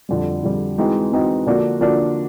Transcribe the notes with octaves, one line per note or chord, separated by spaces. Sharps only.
F2 D3 G3
F2 D3 G3
E3 G#3 C4 D#4 F#4
E3 G#3 C4 D#4 F#4
D3 F3 A#3 D4 F#4
D3 F3 A#3 D4 F#4